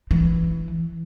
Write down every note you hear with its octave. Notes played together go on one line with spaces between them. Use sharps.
E3